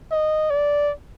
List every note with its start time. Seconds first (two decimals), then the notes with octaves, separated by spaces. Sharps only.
0.12 D#5
0.50 D5